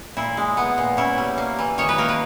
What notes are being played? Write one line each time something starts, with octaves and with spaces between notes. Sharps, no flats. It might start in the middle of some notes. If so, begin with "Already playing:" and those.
A#2 E4
G#3
B3
A#2
C#4 E4
G3
A#3
E3
D#3 C#5
B4
A#3 A#4
B4